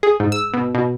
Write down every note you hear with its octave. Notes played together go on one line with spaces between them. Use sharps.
G#4
G#2
E6
B2
B2